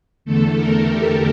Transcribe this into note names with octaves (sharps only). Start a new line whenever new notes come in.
E2 D3 A3 A4
A#4
G4